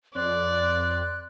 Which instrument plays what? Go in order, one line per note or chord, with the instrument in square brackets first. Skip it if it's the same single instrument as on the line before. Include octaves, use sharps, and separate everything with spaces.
[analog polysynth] F2 [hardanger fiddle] D5 [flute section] C6 F#6